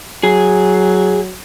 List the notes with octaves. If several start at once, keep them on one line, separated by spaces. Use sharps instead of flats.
F#3 G#4